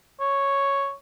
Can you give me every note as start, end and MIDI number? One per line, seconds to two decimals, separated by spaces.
0.20 0.94 73